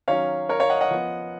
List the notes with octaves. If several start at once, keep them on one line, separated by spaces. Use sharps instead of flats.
D#3 F#3 C#4 C#5 F5
A#4 C#5
C#5 F5
D#5 F#5
D#5 F#5
F3 B3